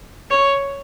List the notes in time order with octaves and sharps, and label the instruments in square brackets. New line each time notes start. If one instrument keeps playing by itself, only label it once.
[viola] C#5